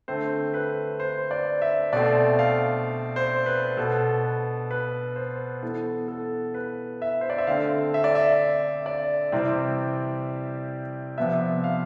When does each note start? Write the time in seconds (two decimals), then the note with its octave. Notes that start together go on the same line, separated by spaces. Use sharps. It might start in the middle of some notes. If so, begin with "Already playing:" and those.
0.08 D3 A3 C4 C5
0.54 B4
1.00 C5
1.31 D5
1.62 E5
1.93 B2 A3 C4 D5
2.39 F5
3.16 C5
3.46 B4
3.77 B2 B3 A4
4.24 B4
4.71 B4
5.16 C5
5.62 E3 B3 A4
6.08 A4
6.54 B4
7.02 E5
7.21 C5
7.30 D5
7.38 E5
7.47 D3 A3 C4 F5
7.94 E5
8.04 D5
8.15 E5
8.86 D5
9.32 C3 E3 G3 C4
11.18 C3 F3 B3 E5
11.64 F5